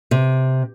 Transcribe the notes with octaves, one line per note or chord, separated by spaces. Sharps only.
C3